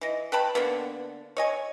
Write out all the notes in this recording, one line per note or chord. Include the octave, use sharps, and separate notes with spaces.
E3 D#5
B4 G5 A5 B5
D3 A#3 B3
C#5 D#5 G#5